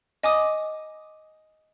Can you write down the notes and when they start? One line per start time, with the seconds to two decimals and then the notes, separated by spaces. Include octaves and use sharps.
0.23 D#5 G#5 D6 D#6